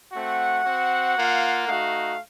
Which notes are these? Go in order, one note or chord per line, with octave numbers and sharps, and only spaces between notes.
A3 C4 F#4 F#5
C4 F#4
A#3 F4
A3 D#4 F#4 F5